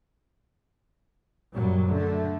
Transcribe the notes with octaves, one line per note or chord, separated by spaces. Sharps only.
F#2 A#2 F#3 G3
D3 A3